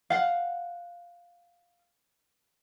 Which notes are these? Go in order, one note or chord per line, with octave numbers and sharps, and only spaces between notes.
F5 F#5